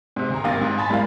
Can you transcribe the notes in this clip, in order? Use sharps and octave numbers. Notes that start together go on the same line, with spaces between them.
G#2 C3
D2 A#5
G#1 G2 A#3 F5 A6 A#6
G#2
G#5 A5 B5 A6
G3 G#3 E4 A#4 F5